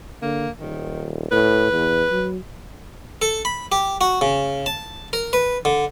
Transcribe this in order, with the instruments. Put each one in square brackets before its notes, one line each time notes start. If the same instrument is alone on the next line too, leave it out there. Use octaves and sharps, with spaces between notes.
[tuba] D3 [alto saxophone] A#3
[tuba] D#1 [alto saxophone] D#3
[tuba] A2 [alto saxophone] B4
[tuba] E2
F#3
[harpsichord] A4
B5
G4
F#4
C#3
A5
A#4
B4
D3